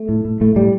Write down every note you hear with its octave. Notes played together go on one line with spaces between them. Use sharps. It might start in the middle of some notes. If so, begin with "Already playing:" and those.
Already playing: A3
A2
A2
A2 A3
A2 G3